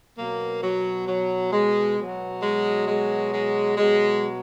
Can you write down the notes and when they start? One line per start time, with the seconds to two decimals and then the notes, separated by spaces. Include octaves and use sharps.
0.17 B2 F#3 A#3
0.62 F#3
1.08 F#3
1.52 G#3
1.98 B2 F#3
2.42 G#3
2.87 G#3
3.33 G#3
3.77 B2 F#3 G#3